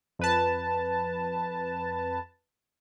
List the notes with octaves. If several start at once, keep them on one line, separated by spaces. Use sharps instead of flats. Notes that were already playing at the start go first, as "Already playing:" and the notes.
F2 B4 A5